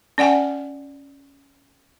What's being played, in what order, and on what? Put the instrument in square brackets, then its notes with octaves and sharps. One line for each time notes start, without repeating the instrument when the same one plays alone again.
[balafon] C#4 D5 F#5 G#5